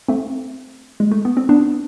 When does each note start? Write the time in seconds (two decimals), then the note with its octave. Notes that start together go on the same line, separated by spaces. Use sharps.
0.08 A3 C4
1.00 G#3
1.12 A3
1.25 B3
1.37 C4
1.49 B3 D4